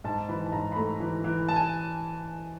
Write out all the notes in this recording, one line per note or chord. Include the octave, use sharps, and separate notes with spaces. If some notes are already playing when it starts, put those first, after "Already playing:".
G#2 A5
E3 B5
A5
G#2 A#5
B5
A3 A#5
E3
E3
A5
G#5